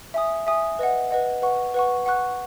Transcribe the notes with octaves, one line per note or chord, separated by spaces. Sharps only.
E5 G#5 D#6
E5 G#5 D#6
B4 D#5 F#5
B4 D#5 F#5
B4 F#5 C#6
B4 F#5 C#6
F#5 C#6 F#6